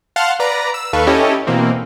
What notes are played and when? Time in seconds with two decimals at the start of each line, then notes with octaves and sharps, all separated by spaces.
0.16 F5 F#5 A5 C6 F6
0.40 B4 D5 A#5
0.74 E6
0.93 D#2 A4 B4 F5 C#6
1.07 C#4 E4 G4 A4 C#5 D#5
1.47 B2 E3 A#3 C4